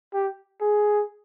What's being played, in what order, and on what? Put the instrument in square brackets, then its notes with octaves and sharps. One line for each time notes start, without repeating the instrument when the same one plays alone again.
[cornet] G4
G#4